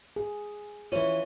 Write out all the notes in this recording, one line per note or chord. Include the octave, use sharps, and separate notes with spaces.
G#4
E3 C#4 F4 C#5